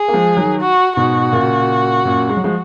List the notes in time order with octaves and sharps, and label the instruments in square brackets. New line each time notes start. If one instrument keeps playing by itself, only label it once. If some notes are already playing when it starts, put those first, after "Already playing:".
Already playing: [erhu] G#4
[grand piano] A#3
F3 G#3
D#3 F#3
[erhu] F#4
[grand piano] G#2 B2 [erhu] F#4
[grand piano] A#2 C#3
F#2 A#2
G#3
F#3
F3 G#3